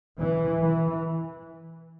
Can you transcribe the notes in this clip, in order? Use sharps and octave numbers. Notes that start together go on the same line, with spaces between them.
E3
E3